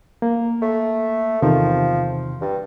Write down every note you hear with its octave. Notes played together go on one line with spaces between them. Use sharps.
A#3
A3
E2 C3 D#3 F3
G2